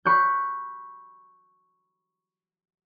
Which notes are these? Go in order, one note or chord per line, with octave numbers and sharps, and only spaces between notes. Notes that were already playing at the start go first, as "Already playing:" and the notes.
B5 C#6 F#6 G6